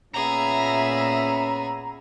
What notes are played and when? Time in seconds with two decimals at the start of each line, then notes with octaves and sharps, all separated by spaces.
0.14 A#2 B3 C#4 G#4 E5 A#5